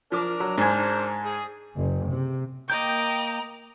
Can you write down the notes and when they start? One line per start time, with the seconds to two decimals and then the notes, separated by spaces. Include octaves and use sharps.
0.12 F3 D4 A#4 D6
0.40 F#3
0.58 G#2 D4 A#4 C5 G#5
1.25 G#4
1.75 F#1
2.09 C3
2.70 A#3 D#5 G5 A#5 D6 G6